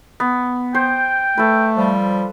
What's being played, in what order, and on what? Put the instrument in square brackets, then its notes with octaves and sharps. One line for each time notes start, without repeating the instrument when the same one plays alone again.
[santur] B3
[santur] C5 [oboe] G5
[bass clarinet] A3 [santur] A4 B4
[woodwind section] F3 G3